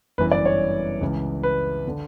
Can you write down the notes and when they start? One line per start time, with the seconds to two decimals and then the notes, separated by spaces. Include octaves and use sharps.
0.18 G1 F#2 E3 B4
0.31 D5
0.45 C#5
1.01 C#2 C#3 E3
1.43 B4
1.87 D3